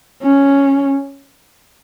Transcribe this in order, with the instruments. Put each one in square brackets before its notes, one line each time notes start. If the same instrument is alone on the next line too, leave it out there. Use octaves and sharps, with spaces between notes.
[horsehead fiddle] C#4